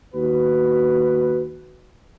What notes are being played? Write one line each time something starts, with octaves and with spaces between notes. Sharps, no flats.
D#2 F#4 B4